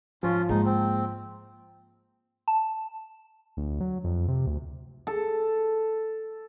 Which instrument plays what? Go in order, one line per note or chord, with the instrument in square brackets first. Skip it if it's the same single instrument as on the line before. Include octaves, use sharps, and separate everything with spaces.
[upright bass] G#2 [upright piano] F3 [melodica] C#4 F4
[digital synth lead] G#2 [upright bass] G#3 A#3 [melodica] D#4
[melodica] C4
[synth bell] A5
[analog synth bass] D2
F#3
F2
C3
D2
[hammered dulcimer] A4